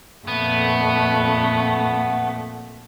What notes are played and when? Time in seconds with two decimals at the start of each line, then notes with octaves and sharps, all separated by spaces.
0.27 F2 A#2 A3 B3